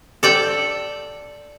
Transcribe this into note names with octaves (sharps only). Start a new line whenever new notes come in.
A4 D5 G5